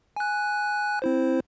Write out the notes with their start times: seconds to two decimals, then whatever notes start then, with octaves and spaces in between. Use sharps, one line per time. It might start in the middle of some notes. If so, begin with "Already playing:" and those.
0.16 G#5 F#6
1.02 C4 E4 C5